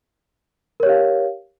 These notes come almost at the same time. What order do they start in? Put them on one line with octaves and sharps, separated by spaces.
A#4 C#5 G4 F5